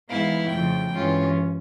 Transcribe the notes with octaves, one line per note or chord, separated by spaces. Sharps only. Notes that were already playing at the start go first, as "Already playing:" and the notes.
G#2 E3 G#3 B3 E4 F5
F2 C#3 F3 A3 G5
G2 E3 G#3 C#4 F4